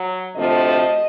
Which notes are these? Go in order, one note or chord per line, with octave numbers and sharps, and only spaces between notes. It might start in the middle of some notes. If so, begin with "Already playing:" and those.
Already playing: F#3
D2 C3 F3 A3 D#5